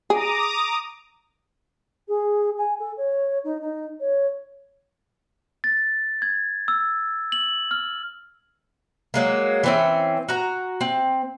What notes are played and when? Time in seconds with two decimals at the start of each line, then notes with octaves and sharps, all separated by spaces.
0.10 G#4 A#5 D6 D#6
2.08 G#4
2.57 G#5
2.79 A4
2.97 C#5
3.44 D#4
3.61 D#4
4.00 C#5
5.64 A6
6.22 G#6
6.68 E6
7.32 F#7
7.71 F6
9.14 F#3 G#3 A#3
9.64 E3 C4 C#4
10.29 F#4 A#5
10.81 C4